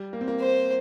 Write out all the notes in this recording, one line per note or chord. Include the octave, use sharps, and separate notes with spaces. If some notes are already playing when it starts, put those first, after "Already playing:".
Already playing: G3
A#3
C4
A#3
C5